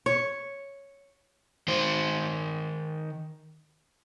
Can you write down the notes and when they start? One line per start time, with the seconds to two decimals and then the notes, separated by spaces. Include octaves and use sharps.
0.06 C#5
1.68 D#3 C5